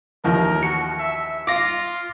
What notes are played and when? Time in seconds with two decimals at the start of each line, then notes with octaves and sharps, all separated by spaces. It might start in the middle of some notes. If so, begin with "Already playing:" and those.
0.24 A1 D#2 F3 A#4
0.63 F#4 C#7
0.99 E5
1.47 F4 F5 D6 A#6